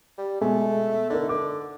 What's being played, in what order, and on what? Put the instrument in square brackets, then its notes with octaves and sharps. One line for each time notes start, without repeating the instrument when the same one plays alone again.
[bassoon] G3
[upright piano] B2 G#3 G#5 [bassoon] A3
[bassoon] D3 [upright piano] D#4 A#4
[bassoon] D3 [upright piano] D6